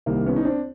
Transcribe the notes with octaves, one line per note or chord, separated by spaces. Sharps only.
C2 C3 D#3 A#3
B3 C#4
D#4
C4 D4